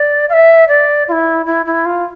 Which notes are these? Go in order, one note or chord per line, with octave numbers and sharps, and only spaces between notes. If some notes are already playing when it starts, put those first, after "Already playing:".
Already playing: D5
F5
E5
D5
F4
E4
E4
E4
F4